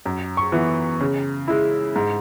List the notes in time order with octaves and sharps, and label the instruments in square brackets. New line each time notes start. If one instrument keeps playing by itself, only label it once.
[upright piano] F#2
C#6
E3 B3 E4
C#3
G#3 E4
G#2